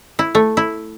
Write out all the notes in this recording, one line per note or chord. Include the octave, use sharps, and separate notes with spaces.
E4
A3
E4